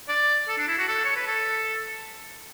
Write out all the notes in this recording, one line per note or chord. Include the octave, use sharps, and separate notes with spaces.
D5
A4
D4
E4
F#4
A4
C#5
B4
A4